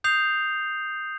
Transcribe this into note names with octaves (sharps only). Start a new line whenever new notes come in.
D#6 G6 C7 F7